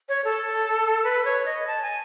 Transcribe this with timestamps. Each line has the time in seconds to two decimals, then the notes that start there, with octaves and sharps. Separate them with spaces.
0.09 C#5
0.24 A4
1.04 B4
1.25 C#5
1.45 D#5
1.67 A5
1.82 G#5